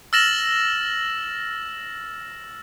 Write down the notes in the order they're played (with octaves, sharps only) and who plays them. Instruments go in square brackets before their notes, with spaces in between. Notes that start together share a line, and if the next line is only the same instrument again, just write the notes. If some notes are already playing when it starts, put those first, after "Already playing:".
[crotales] E6 F6 A6 A#6 E7 F#7